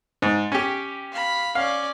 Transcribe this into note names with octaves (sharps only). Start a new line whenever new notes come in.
G#2
C#4 G4
F5 B5
C#4 D5 F5